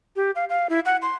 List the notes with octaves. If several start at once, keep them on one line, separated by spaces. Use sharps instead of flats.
G4
F5
F5
E4
F#5
C6